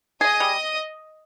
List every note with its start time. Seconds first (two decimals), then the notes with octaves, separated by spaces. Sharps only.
0.21 G#4 D#5 D#6
0.40 G3